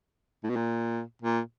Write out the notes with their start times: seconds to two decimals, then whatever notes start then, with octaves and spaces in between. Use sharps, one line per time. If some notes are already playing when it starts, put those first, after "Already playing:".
0.44 A2
0.50 B2
0.56 A#2
1.22 A#2